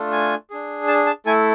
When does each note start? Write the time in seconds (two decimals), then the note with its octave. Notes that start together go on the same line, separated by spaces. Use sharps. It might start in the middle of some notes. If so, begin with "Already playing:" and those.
Already playing: A3 D4 F4 A4
0.12 G#5
0.50 D4 G#4
0.88 A5
1.07 A5
1.26 A3 E4 A4 G#5